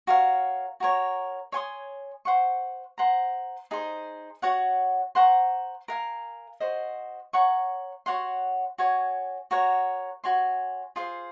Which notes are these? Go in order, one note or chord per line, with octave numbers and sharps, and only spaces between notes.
F#4 A#4 C#5 F5
F#4 A#4 C#5
C#5 G#5 C6 D#6
C5 F#5 C#6
C5 F#5 A#5
D#4 G#4 C5
F#4 C#5 F#5
C5 F#5 A#5 C#6
A#4 F5 G#5
F#4 C5 D#5
C#5 F#5 A#5 C#6
F#4 C#5 F#5 C6
F#4 C#5 G#5
F#4 A#4 C#5 F#5
F#4 C#5 G#5 C6
F4 G#4 C5 F5